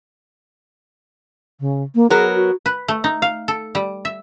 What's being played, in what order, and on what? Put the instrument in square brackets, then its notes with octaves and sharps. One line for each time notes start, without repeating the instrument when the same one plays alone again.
[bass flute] C#3
A#3
[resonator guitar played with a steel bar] F#3 B3 A#4 [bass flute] G#4
[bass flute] F#4
[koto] B4
A3
D#4
F5
A4
G3
E5